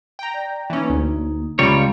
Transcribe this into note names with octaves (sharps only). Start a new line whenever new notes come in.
G5 A#5
D5
E3 A#3 C#4 D#4
D2
C#2 G3 F4 C#5 A#5 B5